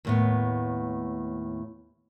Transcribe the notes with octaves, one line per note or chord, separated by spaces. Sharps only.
D#2 A2 B3